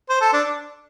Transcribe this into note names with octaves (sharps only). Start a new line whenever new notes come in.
C5
A4
D4